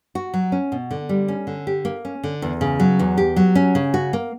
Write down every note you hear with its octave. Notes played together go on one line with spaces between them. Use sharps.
F#4
F#3
C#4
B2
D3
G3
C#4
D3
G4
A#3
C#4
D3
E2
C#3
F#3
E2
G4
F#3
C#4
C#3
F#4
A#3